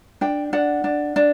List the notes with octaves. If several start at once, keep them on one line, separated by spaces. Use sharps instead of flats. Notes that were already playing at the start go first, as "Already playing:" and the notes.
D4 G5
D4 F#5
D4
D4